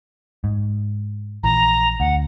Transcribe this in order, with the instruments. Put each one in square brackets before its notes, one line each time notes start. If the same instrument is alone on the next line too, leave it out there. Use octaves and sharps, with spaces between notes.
[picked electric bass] G#2
[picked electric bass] A#1 E3 [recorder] A#5
[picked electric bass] D2 [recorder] F#5